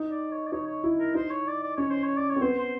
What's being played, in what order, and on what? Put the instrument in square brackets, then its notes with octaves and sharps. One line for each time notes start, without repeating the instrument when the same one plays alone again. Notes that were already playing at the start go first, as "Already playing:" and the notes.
Already playing: [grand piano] D#4
[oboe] D5
C#5
D5
[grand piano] D#4 [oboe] C#5
[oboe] C#5
[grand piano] E4
[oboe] A#4
[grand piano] D#4 [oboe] C5
[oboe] C#5
D5
D5
[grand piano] C#4 [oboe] C#5
[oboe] C5
C#5
D5
C#5
[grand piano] C4
[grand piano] B3 [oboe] C5
[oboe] C5